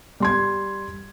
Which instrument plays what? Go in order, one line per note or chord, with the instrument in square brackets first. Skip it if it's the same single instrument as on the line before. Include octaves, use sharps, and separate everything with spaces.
[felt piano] G3 C6 G#6